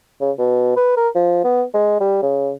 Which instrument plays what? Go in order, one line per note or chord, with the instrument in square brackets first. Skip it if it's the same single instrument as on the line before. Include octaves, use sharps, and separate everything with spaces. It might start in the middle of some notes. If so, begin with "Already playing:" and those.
[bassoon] C#3
B2
B4
A#4
F3
B3
G#3
G3
C#3